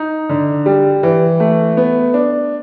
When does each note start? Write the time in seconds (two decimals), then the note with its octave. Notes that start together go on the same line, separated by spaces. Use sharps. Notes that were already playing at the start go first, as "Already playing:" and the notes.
Already playing: D#4
0.29 D3
0.66 G3
1.03 E3
1.40 A3
1.77 B3
2.14 D4